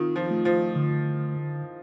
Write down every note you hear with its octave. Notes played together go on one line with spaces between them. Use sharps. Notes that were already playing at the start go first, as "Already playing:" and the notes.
Already playing: D#3 C4 F4
F3
A3
F3
D3